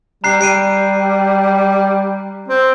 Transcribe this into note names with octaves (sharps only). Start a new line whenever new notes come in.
G3 A#5 F#6 C7
G3 C7 D7 D#7
C4